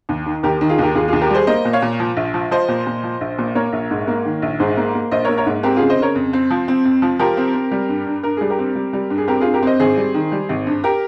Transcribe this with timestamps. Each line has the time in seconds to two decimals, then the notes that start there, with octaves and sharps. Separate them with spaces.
0.09 D#2
0.26 D#3
0.43 D#2 G4 A#4
0.61 D#3
0.69 F4 G#4
0.78 D#2 G4 A#4
0.95 D#2 F4 G#4
1.08 D#2 F4 G#4
1.21 G4 A#4
1.30 G3 G#4 C5
1.47 A#3 C5 D#5
1.65 A#2
1.73 C#5 F5
1.82 A#2
2.00 F3
2.17 A#1
2.34 F3
2.51 F3 C5 D#5
2.68 A#2
2.86 A#2
3.03 F3
3.21 A#1
3.38 A#2
3.55 A#3 A#4 C#5
3.73 A#1
3.90 G#2
4.07 A#3
4.25 D#3
4.42 A#1
4.60 G#2 G#4 C5
4.77 A#3
4.95 A#3
5.11 A#1 C5 D#5
5.25 A#4 C#5
5.29 A#3
5.37 A#4 C#5
5.46 G#2
5.63 C4 G4 A#4
5.76 C#3 F4 G#4
5.90 C5 D#5
5.98 C#3 A#4 C#5
6.15 F2
6.33 C4
6.51 F3
6.68 C4
6.85 F2
7.02 F3
7.19 F3 G4 A#4
7.37 C4
7.54 C4
7.71 G3
7.89 G2
8.07 G2
8.23 G2 A#4
8.37 G3 G#4
8.50 G4 A#4
8.59 C4
8.75 G3
8.93 G3
9.10 G2
9.18 G#4
9.28 C4 G4 A#4
9.41 G2 F4 G#4
9.54 G4 A#4
9.63 C4 C5 D#5
9.80 G#1 G#4 C5
9.97 G3
10.14 D#3
10.32 G3
10.49 G#1
10.67 G2
10.84 G4 A#4